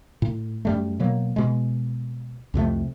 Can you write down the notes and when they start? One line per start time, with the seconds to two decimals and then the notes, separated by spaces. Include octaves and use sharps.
0.22 A2
0.65 F#2 G3 A3
1.00 B2 F#3 A#3
1.36 B2 G#3
2.54 C2 F2 C3 A3